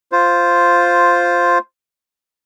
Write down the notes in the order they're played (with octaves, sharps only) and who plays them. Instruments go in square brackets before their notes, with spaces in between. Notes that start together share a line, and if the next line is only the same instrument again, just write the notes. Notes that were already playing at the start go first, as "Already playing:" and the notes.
[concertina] F4 C5